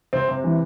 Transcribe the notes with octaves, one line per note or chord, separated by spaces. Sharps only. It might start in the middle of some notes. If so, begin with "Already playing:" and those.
C3 C4
C3
E3